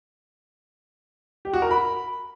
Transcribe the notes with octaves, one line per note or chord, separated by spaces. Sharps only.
G4
F#4
A#4
B5